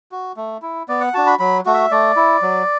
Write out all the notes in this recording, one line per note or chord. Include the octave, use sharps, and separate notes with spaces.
F#4
A3
E4
B3 D5
F#5
D4 F#4 A5
B5
F#3 B5
A3 F#4
E5
A3 D5
E4
F#3